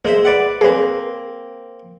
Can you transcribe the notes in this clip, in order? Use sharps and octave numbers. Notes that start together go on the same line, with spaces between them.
G#3 A#3 C5 E5
B4 D5 F#5
A#3 C4 G#4 B4